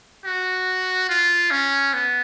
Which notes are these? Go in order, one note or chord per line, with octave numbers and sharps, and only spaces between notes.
F#4
F4
C#4
B3